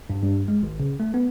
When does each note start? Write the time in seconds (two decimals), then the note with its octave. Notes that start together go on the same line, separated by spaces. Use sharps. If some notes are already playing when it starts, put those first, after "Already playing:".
0.10 G2
0.23 G2
0.48 G#3
0.63 G#1
0.80 C#3
1.00 A3
1.14 B3